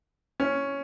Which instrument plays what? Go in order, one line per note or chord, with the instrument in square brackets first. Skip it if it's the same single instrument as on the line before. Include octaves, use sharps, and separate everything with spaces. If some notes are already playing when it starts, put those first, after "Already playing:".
[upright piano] C#4